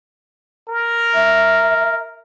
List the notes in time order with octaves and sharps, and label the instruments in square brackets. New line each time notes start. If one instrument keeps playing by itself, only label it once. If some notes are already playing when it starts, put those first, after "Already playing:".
[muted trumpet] A#4
[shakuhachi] E5